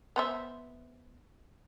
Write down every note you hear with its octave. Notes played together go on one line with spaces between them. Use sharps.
B3 C5 E5